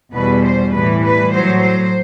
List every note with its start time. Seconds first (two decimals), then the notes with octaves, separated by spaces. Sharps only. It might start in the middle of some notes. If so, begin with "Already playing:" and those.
0.14 E2 B2 G3 B4
0.44 C5
0.73 A2 E3 G3 B4
1.02 B4
1.32 A2 F#3 C5
1.62 C5